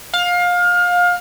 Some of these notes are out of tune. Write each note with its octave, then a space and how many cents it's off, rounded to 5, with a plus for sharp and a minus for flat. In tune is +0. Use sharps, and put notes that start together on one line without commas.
F5 +25